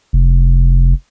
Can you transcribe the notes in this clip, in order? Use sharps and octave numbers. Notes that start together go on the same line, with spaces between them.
F1